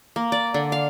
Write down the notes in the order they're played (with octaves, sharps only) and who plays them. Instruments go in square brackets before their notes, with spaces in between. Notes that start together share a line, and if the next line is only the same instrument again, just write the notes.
[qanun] A#3
D5
D3
F5